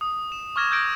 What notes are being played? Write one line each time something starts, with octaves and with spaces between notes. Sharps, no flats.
D#6
E7
C#6 D6 F6 G#6 A#6 E7
E6 F6 G6 G#6 A#6 D7